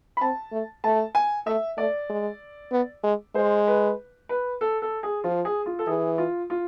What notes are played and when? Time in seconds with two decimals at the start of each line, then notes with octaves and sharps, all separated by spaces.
0.17 B5
0.21 C4 A5
0.52 A3
0.84 A3 A5
1.15 G#5
1.46 A3 E5
1.78 A3 D5
2.10 G#3
2.72 B3
3.04 G#3
3.35 G#3 C5
3.67 B4
4.29 B4
4.61 A4
4.82 A4
5.03 G#4
5.24 F3 F4
5.45 G#4
5.66 F4
5.79 A4
5.87 E3 G#4
6.18 F4
6.50 F4